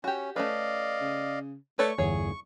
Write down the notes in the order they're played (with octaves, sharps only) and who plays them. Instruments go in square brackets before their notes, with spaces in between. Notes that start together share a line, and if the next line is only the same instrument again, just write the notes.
[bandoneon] C#4 [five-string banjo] F#4 G4
[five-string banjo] A3 C#4 B4 [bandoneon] D5 D#5 F5
[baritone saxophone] C#3
[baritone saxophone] A3 [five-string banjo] B4 C#5 D5 [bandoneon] C#6
[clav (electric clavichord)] G1 E2 [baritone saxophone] G#4 [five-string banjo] C#5